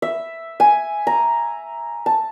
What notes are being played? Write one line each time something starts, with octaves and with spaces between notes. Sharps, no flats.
E5
G#5
A#5
A5